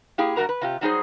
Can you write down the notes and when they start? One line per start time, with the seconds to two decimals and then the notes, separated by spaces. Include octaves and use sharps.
0.18 A#3 E4 G4 G#4
0.36 G2 C3 F#4 A#4 A#5
0.49 B4
0.61 C3 F4 G4
0.81 F#3 G3 D#4 F#4 G#4 C5